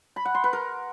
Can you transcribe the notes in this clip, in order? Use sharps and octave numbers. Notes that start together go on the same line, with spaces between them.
B5
F#5
C6
B4
A#4